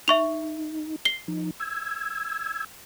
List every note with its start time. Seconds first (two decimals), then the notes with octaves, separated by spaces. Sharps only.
0.08 D#4 E5 C#6 F7
1.05 C7 G7
1.28 F3 D#4
1.60 E6 G#6